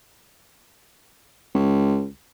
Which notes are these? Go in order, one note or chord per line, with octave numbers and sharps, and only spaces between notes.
C#2